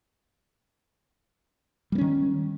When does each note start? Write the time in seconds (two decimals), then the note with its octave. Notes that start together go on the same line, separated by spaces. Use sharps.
1.92 G3
1.95 A#3
1.98 C#4
2.01 D#3